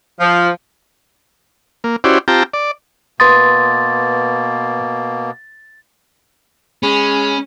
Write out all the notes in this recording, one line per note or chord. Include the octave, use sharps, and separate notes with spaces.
F3
A#3
C#4 E4 F#4 G4 C5 D5
C4 F4 G4 G5 A5 A#5
D5
B2 A#3 B4 C6 D#6 A6
G#3 C#4 B5